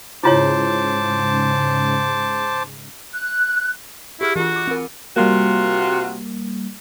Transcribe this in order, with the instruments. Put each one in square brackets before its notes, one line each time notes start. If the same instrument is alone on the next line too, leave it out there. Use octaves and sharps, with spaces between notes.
[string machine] G#2 C#3 [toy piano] E4 F4 C#5 [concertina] C5 A5 D6
[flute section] F#6
[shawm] E4 [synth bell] G4 G#4 F6
[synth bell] E3 F4 [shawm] F#4
[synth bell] D6 C#7
C4 A#4
[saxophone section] C3 F4 F#4 [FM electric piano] G3 A#3